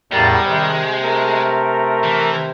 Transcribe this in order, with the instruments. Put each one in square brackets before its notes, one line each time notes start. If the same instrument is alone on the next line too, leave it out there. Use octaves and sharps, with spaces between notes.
[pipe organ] E2 A2 A6 [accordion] C#3 A#4 [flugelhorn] G3 [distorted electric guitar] G#3
[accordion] C3 C5 [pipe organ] D#3
[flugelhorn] A3 [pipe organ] A#4
[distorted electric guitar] E3